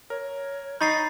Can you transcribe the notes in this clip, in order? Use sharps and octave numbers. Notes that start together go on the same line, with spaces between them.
A#4 C#5
D#4 A#5 B5 C#6 G6 A6 C7